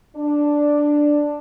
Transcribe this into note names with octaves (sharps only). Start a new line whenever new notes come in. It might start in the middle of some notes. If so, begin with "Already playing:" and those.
D4